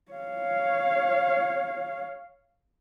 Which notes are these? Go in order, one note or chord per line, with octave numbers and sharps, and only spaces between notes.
C#5 F5